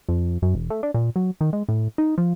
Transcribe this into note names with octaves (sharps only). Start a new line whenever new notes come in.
F2
F#2
E1
A3
D4
A#2
F#3
D#3
G#3
A2
D#4
F3